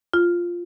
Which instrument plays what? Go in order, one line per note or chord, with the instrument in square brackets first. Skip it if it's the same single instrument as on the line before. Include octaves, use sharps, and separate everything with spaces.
[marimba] F4